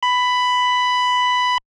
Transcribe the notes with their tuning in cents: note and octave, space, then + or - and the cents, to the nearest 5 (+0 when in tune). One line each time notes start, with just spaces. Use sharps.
B5 +10